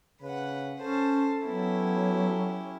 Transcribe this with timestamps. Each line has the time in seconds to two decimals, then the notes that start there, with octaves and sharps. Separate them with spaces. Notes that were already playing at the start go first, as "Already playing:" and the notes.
0.22 C#3 B4 F#5
0.82 C#4 A4 C5 A5
1.47 F#3 B3 C#4 E4 G4